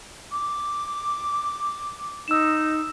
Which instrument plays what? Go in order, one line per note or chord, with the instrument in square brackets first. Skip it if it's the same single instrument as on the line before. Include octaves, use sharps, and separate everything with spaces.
[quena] D6
[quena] D#4 [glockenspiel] E6 E7